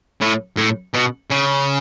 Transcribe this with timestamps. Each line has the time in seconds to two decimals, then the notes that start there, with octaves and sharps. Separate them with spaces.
0.21 A2
0.57 A2
0.94 B2
1.31 C#3